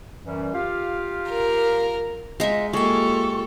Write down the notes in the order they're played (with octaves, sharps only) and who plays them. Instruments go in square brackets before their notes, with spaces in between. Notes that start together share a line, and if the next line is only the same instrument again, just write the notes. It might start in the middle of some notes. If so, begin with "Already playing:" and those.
[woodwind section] F#2 E3 G3
F4 G4 F5
[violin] A#4
[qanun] G#3 E5 [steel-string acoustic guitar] D#4 F4
[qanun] G#3 [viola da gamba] A#3 F4 A4 [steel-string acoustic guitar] G4 G#5 [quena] C#6